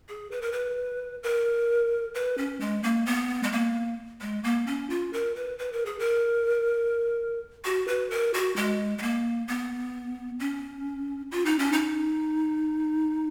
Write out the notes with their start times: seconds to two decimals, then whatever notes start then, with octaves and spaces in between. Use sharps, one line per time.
0.09 G#4
0.31 B4
0.42 A#4
0.52 B4
1.23 A#4
2.15 B4
2.38 C#4
2.60 G#3
2.83 A#3
3.06 B3
3.43 G#3
3.52 A#3
4.21 G#3
4.44 A#3
4.67 C#4
4.90 F4
5.13 A#4
5.36 B4
5.59 B4
5.72 A#4
5.86 G#4
5.99 A#4
7.65 F#4
7.88 B4
8.10 A#4
8.34 F#4
8.56 G#3
8.98 G#3
9.02 A#3
9.48 B3
10.39 C#4
11.31 F4
11.45 D#4
11.59 C#4
11.72 D#4